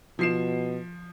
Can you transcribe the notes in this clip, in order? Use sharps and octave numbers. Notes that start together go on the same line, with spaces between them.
B2 F3 C7 E7